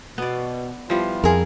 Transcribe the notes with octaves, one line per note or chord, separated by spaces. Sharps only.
B2 B3 D5
F3 G3 B3 E4 F4
F2 G#4 A#4